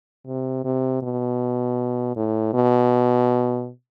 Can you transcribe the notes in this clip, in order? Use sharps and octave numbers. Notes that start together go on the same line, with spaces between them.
C3
C3
B2
A2
B2